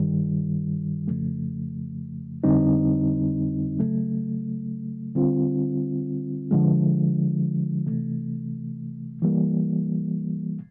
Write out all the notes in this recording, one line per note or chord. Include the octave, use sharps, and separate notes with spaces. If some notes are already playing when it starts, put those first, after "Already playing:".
Already playing: G2 D#3 G3
F2 C#3 F3 A3
F2 D3 G3 C4 D#4
C#3 F#3 A3
D3 G3 C4 F4
D3 F3 G#3
C3 E3 A3
E3 G3 A#3